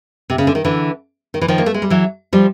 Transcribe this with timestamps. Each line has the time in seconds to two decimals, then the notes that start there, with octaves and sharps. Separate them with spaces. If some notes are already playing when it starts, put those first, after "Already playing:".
0.30 C3
0.38 C#3
0.47 D3
0.55 D#3
0.65 D3 E3
1.34 D#3
1.41 E3
1.48 D#3 F3
1.58 A#3
1.66 A3
1.74 G#3
1.82 G3
1.90 E3 F#3
2.33 F3 G3